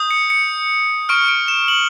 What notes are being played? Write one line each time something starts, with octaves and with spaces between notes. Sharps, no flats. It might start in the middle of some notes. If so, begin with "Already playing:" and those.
Already playing: D#6 G6
C#7
C#7
C#6 F6 D7
D7
E7
F#7